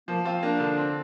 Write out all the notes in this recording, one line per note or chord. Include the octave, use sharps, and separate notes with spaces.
F3 A#3
C4 F4
A#3 D4
D3
C4